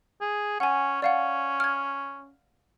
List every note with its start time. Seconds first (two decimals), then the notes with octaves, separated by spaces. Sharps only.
0.21 G#4
0.60 C#4 F#5 G#5
1.02 C#4 D5 F5 F#5
1.60 F6 G#6